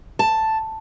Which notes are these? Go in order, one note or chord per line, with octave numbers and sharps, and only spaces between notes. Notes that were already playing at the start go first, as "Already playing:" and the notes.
A5